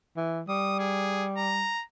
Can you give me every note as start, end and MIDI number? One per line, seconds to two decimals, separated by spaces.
0.17 0.42 52
0.48 1.73 55
0.48 0.76 87
0.79 1.27 68
1.37 1.84 82